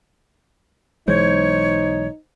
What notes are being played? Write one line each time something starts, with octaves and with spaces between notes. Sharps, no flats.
B1 E3 G#3 D#4 C5 C#5 G#6